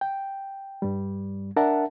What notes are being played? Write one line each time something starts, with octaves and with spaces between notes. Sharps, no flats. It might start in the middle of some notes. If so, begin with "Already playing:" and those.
G5
G2 G3
D4 A#4 E5 F#5 A5